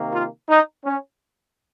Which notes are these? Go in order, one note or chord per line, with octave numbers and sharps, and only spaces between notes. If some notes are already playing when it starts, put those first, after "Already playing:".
Already playing: C3 D#3 A#3
F4
D#4
C#4